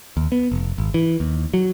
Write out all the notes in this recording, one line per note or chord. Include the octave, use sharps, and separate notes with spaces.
D#2
B3
F1
G#1
E3
D#2
F#3